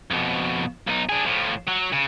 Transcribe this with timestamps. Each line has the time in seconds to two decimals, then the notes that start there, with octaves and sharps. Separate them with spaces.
0.11 F2 B2
0.88 B1 D#4
1.09 D4 G#4
1.25 A2 F3
1.68 F#3
1.93 C#3